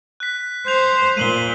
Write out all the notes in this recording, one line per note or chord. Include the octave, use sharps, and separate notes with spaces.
F#6 B6
C5 G6 F7
A#2 D#7 F#7 G7